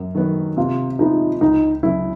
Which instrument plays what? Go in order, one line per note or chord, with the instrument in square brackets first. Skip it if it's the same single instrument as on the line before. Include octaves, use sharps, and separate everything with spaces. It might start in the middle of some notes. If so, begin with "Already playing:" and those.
Already playing: [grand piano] F#2
D#3 F#3 B3
[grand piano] C3 [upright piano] F4
[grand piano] F3 G#3 B3 E4 [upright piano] D#4
[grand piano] C#2 [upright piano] D#4
[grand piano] C#3 F#3 [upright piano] E4